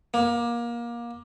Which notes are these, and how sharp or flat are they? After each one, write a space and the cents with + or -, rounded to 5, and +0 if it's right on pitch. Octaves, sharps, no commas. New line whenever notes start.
A#3 +25